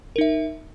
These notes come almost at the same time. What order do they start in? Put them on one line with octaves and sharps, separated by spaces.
A#4 D#4 E5